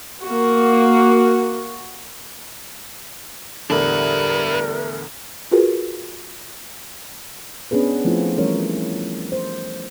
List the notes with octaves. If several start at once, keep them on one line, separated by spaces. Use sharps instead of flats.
A#3 F#4
E2 A2 D3 G3 D4 A#4 B4
F4 F#4 G#4 A#4 B4
B3 C#4 D4 G#4 B4
F3 A3 C4 E4 F4
E3 G3 A3 C#4 A#4 C#5
C5